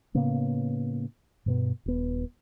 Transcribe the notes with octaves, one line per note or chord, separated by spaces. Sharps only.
A2 C#3 A#3 B3
G2 B2 B3
D#1 B3